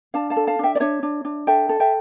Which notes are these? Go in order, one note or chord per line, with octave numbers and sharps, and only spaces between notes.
D4 F5 A5
F5 A5
A4
F5 A5
D4 E5 G5
D5
D4 C#5 E5
D4
D4
A4 E5 G5
A4
E5 G5